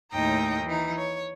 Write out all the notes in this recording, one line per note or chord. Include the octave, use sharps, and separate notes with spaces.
D#2 A2 D#4 D#5 G5 A#5
E3 D#4
C#5